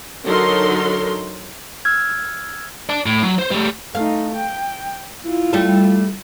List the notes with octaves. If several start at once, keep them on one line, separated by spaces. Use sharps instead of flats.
D3 F#3 D#4 A4 A#4 C6
E6 F6 G#6
D5 A5
A2
F#3
C5
G3 A3
A3 D#4 F5
G5
E4 F4
G3 A3 A4